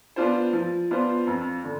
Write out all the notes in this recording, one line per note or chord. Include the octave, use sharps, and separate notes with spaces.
B3 D4 F4 C5
F3
B3 D4 F4 C5
F2
D3